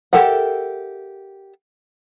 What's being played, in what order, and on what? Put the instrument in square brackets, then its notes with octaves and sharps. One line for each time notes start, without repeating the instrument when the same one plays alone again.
[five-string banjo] G4 A4 A#4 E5 F#5